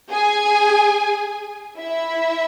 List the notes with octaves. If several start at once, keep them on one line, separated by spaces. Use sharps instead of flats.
G#4 G#5
E4 E5